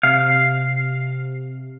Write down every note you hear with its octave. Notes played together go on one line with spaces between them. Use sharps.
C3 F5